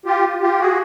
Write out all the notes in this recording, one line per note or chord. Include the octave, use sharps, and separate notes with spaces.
F4 G4
F4 G4
F#4 G#4